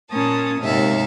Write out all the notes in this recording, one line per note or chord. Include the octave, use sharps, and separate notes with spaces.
A#2 A#3 C#4 A5 D#6
D#2 G#2 C3 G#3 E5 F5